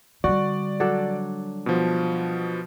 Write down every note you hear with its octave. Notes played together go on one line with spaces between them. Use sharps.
D3 G3 F#4 D5
F#3 D4 A4
B2 F3